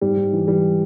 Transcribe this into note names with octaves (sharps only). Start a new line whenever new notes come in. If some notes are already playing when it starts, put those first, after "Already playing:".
G#2 G3
G#2
E3
E3 G3